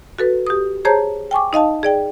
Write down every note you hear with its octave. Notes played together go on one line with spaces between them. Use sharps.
F#4 A4 B4
G4 D#6
G#4 C5 C#5 A5 A#5 G6
G5 G#5 C#6 D6
D#4 D#5 F5 A5
G#4 D5 G5